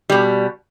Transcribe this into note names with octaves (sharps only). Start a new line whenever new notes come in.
B2 G3